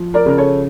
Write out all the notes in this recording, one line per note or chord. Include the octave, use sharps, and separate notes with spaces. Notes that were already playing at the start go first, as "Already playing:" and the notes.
Already playing: F3
A#4 D5
C#3 A#4
A4 C#5